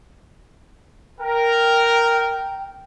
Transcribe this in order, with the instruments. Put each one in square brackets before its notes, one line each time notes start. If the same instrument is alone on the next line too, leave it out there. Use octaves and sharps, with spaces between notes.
[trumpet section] A#4 [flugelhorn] G5